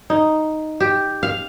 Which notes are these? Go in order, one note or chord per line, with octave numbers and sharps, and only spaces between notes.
D#4
G4
F5